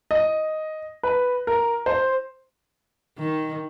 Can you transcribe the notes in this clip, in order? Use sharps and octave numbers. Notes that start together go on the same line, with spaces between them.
D#5
B4
A#4
C5
D#3